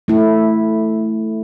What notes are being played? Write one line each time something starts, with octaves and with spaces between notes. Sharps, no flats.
A3 E4